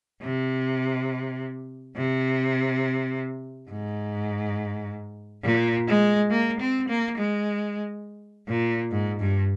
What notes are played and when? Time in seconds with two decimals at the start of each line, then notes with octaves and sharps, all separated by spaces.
0.22 C3
1.96 C3
3.70 G#2
5.44 A#2
5.88 G#3
6.31 A#3
6.60 C4
6.88 A#3
7.18 G#3
8.48 A#2
8.91 G#2
9.20 G2